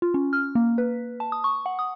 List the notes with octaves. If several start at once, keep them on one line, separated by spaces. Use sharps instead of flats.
F4
C#4
F6
A#3
B4
A5
D#6
C#6
F#5
D#6